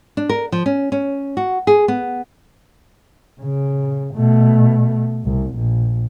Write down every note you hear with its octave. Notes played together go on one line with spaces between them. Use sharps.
D4
A#4
F3
C#4
C#4
F#4
G#4
B3
C#3
B2 A3
C2
A#1